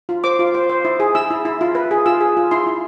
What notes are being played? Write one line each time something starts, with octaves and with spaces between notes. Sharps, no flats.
F4
C5 D6
F4
C5
C5
E4
G#4
E4 E6
E4
E4
F4
B4
G#4
F4 E6
G#4
F4
E4 C6
E4